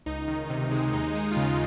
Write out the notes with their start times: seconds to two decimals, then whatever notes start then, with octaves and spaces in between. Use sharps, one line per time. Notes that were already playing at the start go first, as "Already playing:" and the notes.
0.06 C#2 D#4
0.28 D#3
0.50 C3
0.71 G#3
0.93 D#2 D#4
1.15 G#3
1.31 F4
1.37 C#3 D#4